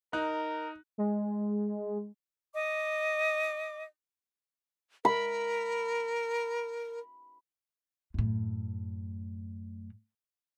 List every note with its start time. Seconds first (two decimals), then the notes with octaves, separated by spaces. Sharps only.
0.13 D#4 A#4 F#6
0.98 G#3
2.54 D#5 D6
5.05 A#4 B5
8.14 F#2 A2